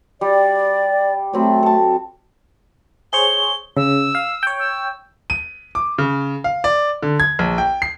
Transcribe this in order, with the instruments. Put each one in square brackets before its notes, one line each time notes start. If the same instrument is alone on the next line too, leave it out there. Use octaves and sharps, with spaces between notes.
[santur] G3 [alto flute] D5
[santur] F#3 C4 B5 [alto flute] A3
[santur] A4 A5
[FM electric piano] G#4 C5 C#5 [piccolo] G7
[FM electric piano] C#3 [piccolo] E6
[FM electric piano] F5
C#5 G5
[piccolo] E6
[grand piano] D#7
D6
C#3
F5
D5
D3
G#6
A#1
G5
C7